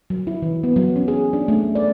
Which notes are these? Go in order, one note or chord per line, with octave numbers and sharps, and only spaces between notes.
F#3
E4
E3
B3
F#3
C#4
G#4
D4
A3
D5